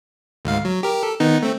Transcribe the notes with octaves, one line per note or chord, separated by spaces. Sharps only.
D2 G#2 F5
F#3
G4 A#4
A4
D#3 B3 D#4
A3 C4